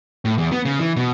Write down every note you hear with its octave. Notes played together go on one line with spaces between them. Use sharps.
A2
E2
B3
C#3
E3
B2